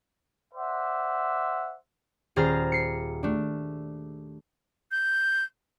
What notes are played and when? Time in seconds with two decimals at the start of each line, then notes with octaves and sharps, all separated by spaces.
0.54 C5 D5 E5 F#5
2.36 D#1 G#4 C5 A#5 F6 A6
2.72 C7 C#7
3.23 A3 D4
4.91 G6